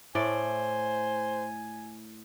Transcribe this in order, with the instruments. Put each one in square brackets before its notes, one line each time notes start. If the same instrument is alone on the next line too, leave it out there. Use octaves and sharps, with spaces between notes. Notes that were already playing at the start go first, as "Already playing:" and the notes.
[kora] A2 A3 D5 [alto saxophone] C5 [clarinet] G#5